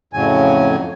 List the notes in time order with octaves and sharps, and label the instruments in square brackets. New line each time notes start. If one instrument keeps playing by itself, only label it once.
[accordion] F2 A2 C#3 F#3 G#5